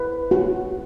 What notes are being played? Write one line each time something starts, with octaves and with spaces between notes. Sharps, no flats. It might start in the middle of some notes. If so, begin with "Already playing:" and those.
Already playing: B4
F#4